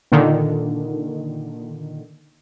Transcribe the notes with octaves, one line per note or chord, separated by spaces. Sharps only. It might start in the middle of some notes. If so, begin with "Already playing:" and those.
A#2 D3 D#3